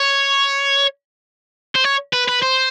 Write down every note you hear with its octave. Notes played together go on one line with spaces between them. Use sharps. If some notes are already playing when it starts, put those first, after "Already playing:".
Already playing: C#5
C5
C#5
B4
B4
C5